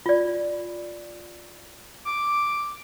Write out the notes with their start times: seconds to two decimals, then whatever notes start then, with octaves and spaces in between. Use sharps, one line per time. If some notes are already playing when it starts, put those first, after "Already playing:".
0.06 F4 D5
2.05 D6